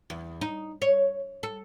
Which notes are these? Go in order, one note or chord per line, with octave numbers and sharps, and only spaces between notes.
E2
D#4
C#5
A4